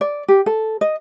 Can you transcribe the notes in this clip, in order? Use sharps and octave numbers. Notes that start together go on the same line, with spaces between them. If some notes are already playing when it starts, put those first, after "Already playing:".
D5
G4
A4
D#5